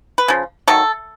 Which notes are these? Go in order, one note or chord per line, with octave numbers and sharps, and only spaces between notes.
B4
C#3 F3
D#3 F#3 A3 A4